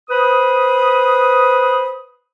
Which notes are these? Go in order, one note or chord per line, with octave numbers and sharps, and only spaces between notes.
B4 C5 B5 D#6